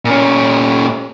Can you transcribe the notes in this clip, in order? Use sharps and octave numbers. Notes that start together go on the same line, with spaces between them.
A#2 C#4